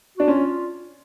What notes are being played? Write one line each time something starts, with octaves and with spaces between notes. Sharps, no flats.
D4 F#4
C#4 F4